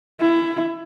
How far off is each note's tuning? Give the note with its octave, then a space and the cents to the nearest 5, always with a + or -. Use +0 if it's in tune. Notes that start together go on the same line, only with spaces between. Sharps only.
E4 +20